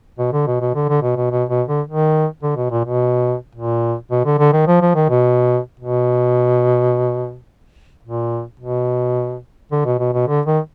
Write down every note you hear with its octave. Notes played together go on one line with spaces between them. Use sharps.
B2
D3
B2
B2
D3
D3
B2
B2
B2
B2
D3
D#3
D3
B2
A#2
B2
A#2
B2
D3
D3
D#3
F3
F3
D#3
B2
B2
A#2
B2
D3
B2
B2
B2
D3
D#3